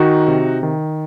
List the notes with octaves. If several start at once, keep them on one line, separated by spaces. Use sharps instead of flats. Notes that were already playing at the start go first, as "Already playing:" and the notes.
Already playing: D#3 D#4 F#4
C3
D#3